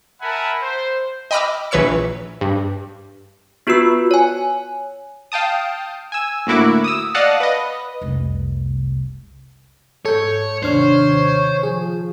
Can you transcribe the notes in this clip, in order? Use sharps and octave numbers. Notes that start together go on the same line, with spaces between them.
A#4 E5 F#5 G#5 A5 B5
C5
D#5 G5 B5 D6 E6 F6
A#1 E3 B4 C#5 E6 C#7
G2
B3 F4 F#4 B4 E6
C#5 G#5
F5 G5 A5 D#6
G#5 E6
D2 A2 A#3 E4 F#4 D6
D#6 E6
D5 D#5 F5 F#5 A5
B4 D#5
F1 C2
G#2 A4 C#5 G6
D#2 C3 D#3 D4 C5 C#5 F6
F3 G#4